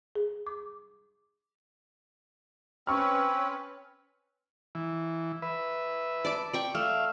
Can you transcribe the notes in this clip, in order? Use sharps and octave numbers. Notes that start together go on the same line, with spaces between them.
G#4
D6
C4 C#4 B4 C#6 F6
E3
B4 E5
D5 A5 D6
D5 G5 C#6
A3 E5 F5